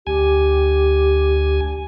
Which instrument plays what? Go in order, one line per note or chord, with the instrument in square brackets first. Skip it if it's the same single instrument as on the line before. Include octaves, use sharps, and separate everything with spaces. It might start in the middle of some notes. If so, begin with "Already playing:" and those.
[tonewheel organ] D2 G#5 [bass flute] G4